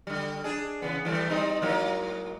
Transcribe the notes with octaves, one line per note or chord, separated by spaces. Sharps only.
D3 G3
D4 G#4
C#3 E3 B3
E3 G3 A3
G3 C4 D#4
G#2 F#3 A#3